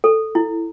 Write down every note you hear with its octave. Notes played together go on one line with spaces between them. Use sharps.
A4
E4